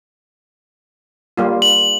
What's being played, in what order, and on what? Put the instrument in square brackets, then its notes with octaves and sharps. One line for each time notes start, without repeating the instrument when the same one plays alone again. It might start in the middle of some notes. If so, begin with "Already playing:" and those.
[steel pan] G3 A#3 F4
[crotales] F#7